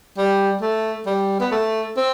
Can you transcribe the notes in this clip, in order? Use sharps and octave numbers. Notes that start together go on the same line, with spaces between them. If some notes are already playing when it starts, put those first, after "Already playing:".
G3
A3
G3
B3
A3
C4